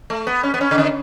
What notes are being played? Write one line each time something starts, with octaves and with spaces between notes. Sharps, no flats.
A3
B3
C#4
B3
C#4
C#3
D3